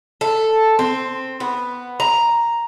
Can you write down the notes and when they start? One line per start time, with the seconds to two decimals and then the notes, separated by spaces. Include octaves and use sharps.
0.21 A4
0.79 C4
1.40 B3
2.00 A#5